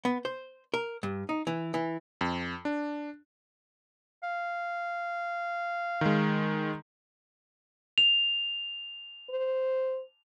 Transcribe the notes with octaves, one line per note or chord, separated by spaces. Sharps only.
B3
C5
A#4
G2
D#4
E3
E3
F2
D4
F5
D#3 G#3
F7
C5